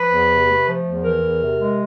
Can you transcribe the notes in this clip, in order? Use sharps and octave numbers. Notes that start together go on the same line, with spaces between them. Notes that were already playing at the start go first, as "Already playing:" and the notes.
Already playing: F3 B4
E2
C3
A3
F3
E2
E3 A#4
E2
C3
G#3